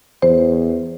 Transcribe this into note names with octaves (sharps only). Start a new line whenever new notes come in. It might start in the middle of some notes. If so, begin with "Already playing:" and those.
E2 C5